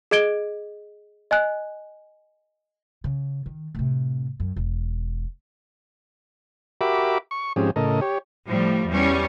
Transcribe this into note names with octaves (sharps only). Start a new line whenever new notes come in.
G#4 D#5 G#6 D7 G7
D#5 G#5 F#6
C#3
D#3
A2 C3
F#2
E1
F#4 G4 A#4 E5 B5 D6
C#6
G#2 F3 C4 C#4 G4 G#4
A2 C#3 A4 A#4 D#5
G4 C#5
A2 F3 G3
E2 G3 C#4